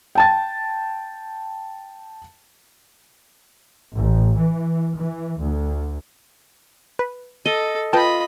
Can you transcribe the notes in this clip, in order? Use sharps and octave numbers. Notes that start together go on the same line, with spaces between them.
G5 A5 A6
A1
E3
E3
D2
B4
A4 D#5
F4 B4 D#5 G5 A5 B5